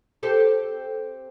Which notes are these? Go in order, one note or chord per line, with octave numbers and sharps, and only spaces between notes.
C4 G4 A4